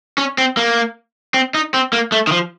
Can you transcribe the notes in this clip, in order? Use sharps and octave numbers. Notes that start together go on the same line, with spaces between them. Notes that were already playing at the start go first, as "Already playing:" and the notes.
C#4
C4
A#3
C4
D#4
C4
A#3
A3
D#3
F3